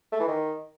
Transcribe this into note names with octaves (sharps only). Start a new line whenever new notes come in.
A3
E3
D#3